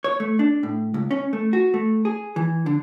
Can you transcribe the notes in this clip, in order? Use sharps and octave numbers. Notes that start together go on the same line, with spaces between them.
C#5
A3
D4
A2
C#2
C#4
A3
F#4
A3
G#4
E3
D3